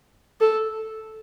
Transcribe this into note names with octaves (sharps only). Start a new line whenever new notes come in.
A4